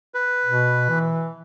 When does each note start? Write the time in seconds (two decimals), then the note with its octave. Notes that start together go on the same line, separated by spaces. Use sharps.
0.14 B4
0.46 B2
0.90 E3